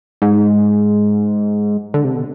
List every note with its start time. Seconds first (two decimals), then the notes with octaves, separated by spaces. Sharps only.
0.22 G#2
1.94 D3
2.04 C3
2.14 B2